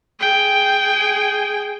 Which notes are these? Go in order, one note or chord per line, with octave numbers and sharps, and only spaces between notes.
G#4 G5